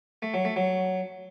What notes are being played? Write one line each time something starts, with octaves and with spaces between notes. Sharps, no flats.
A3
F#3
A3
F#3